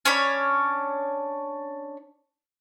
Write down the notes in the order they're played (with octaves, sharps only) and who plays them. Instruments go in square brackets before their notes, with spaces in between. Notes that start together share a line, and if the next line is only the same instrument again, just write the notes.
[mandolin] C#4 D4 C#5 B5